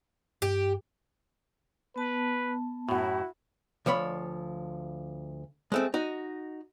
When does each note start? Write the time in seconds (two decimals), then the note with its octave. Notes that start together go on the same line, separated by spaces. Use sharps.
0.42 G2 G4
1.96 B3 B4 A5
2.89 F#2 A2 E4 F#4
3.86 D2 F3 C#5 B5
5.72 G#3 A3 C4
5.94 D#4 F#4